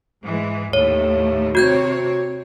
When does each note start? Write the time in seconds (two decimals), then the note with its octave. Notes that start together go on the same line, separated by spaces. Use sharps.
0.23 G#2 E3 G#3
0.73 D#2 A2 A3 C#5
1.55 C3 C4 F#4 C#5 G6 G#6